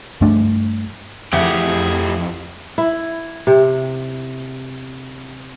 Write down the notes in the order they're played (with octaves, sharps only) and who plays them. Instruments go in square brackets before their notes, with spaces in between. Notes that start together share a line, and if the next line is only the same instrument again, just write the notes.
[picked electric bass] G2 A3 D4
[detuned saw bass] F2 [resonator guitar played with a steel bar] E3 F#5 [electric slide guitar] A3 G4 G5 [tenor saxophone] G#4
[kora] E4
C3